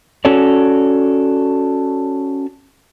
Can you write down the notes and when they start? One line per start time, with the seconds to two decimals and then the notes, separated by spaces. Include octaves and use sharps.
0.25 C#4 F#4 A4 C#5 D5